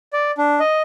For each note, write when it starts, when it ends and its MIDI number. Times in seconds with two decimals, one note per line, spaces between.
0.13 0.31 74
0.38 0.59 62
0.60 0.82 75